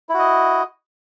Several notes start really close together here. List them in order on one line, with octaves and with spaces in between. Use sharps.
E4 F#4 D#5